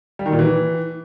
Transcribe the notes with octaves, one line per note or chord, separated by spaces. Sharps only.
G3
D#3
A#2
E3